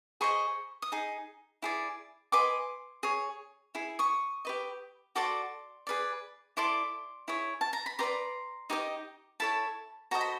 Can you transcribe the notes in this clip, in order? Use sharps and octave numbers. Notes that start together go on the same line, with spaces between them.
G#4 C5 D#5 B5 C#6
D#6
D#4 G#4
E4 G#4 D5
G#4 B4 D#5 C6 D6
G#4 C#5
E4 G#4
C#6 D#6
G4 B4 D#5
F#4 A4 D5 C6 D6
G#4 B4 D5
E4 A4 D5 C6 D6
E4 G#4 C#5
A5
A#5
B5
G4 B4 D5 A#5 C6
D#4 G4 C5 D#5
E4 A4 C#5 A5 B5
F#4 A4 C5 D#5 A#5
B5